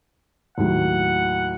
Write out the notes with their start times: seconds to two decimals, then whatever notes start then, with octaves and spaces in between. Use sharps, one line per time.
0.58 D#2 A2 F#3 F#5